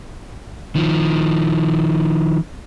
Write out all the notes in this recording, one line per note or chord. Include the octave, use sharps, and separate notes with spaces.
D#3 F3